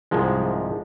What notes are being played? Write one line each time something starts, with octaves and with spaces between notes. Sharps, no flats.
C2 G#2 F3 G#3